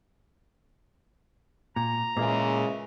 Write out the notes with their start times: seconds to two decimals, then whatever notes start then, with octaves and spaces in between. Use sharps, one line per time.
1.76 A#2 A#5
2.17 A#2 C#3 E3 G#3 A#3